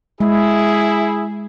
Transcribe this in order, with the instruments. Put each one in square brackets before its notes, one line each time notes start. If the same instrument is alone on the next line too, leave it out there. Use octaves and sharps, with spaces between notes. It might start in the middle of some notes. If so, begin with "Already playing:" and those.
[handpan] G#3 [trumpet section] E4 G#4